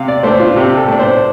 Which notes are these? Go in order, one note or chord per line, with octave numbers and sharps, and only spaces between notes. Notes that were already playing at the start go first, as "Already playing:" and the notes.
Already playing: C3 F5
D5
A3 D4 C5
F4
C3 G4
A4
A3 D4
C5